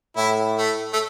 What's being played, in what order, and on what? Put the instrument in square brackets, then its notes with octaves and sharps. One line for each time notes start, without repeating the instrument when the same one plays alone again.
[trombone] A2 [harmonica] E4
[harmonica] A3
A3